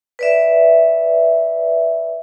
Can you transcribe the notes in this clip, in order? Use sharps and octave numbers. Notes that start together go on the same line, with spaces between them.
B4 D5 E5